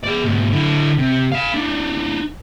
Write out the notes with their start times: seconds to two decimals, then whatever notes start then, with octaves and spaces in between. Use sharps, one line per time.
0.04 G#4 D5
0.25 G#2 B2
0.53 D3 E4
0.97 C3
1.32 F5 B5
1.54 D4 D#4